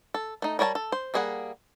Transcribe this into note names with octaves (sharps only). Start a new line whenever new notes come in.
A4
A3 D#4
G3 A#4 C#5 G#5 A5
A4
C5
G3 A#3 G#4 C#5 F#5